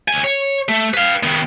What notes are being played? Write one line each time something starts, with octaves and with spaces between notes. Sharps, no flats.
D2 G#5
C#5
A3
B4 F5
D#3 B3